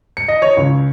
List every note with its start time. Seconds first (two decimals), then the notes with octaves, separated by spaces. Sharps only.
0.17 C#7
0.28 D#5
0.42 C#5
0.57 C#2